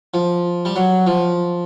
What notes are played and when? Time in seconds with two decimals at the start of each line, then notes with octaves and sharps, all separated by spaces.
0.14 F3
0.65 G3
0.76 F#3
1.07 F3